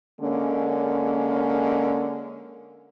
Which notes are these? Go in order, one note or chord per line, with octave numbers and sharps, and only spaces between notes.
D3 G#3 A#3 C#4